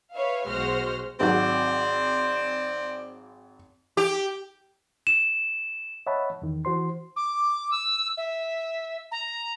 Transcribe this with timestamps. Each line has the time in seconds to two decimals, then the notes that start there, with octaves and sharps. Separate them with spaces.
0.14 B4 C#5 E5 F5
0.47 B1 G#3 F#4 C5 F6 A#6
1.20 G#1 F#3 C4 D5
3.97 G4
5.07 E7
6.07 C#5 D#5 E5 F#5 A5 B5
6.42 E2 D#3
6.65 E3 F#4 C5 C6
7.16 D6
7.71 E6
8.17 E5
9.11 A#5